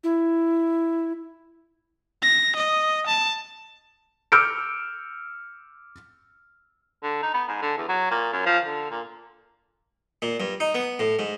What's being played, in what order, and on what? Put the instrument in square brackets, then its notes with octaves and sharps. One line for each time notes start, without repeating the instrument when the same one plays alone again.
[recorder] E4
[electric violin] A#6
D#5
A5
[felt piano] D6 E6 F6 G6 C#7 D7
[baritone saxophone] D3
D#4
B3
G#2
D3
E2
F#3
A#2
F#2
F3
D3
A#2
[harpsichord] A#2
G2
D#4
B3
A2
G#2